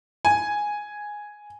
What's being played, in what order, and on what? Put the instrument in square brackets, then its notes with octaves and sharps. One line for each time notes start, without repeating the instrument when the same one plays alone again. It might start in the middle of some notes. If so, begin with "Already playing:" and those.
[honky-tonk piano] G#5